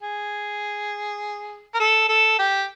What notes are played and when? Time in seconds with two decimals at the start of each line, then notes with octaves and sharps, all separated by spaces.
0.02 G#4
1.74 A#4
1.80 A4
2.09 A4
2.39 G4